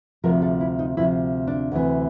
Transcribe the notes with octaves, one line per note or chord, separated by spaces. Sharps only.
D2 C3 F3 A#4
A4
E4
D#4
D2 C3 F3 E4
D4
D2 C3 E3